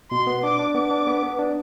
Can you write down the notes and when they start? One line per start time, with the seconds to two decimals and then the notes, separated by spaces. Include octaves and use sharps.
0.11 B2 C6
0.27 B3
0.43 D4 D6
0.59 D4
0.75 B3 D6
0.91 D4
1.07 B3
1.23 B3
1.39 D4